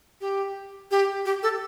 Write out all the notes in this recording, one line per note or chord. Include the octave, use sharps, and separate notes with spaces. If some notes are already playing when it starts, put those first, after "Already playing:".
G4
G4
G4
A4